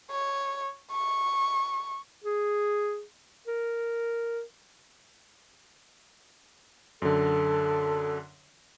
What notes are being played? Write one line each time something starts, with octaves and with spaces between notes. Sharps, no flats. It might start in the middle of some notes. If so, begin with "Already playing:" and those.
C#5
C#6
G#4
A#4
F#2 D3 A4